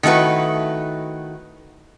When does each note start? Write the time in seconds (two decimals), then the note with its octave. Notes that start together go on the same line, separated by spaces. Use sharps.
0.03 D#3 A3 E4 F#4 B4